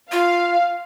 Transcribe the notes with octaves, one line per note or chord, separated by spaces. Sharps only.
F4 F5